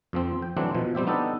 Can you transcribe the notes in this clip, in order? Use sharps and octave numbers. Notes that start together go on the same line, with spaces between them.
F2 F3 C4
G5
D3 E3 F#3 A3 C4 D4
B2 F3
G3 C4 G4 E5
B3 D4 D#4 G4 A4